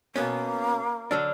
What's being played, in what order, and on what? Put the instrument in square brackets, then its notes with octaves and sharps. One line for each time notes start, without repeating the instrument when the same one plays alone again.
[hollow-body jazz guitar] B2 B3 C#4 [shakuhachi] A#3
[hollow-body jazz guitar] D3 F#3 D4 [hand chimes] D5 E6 F6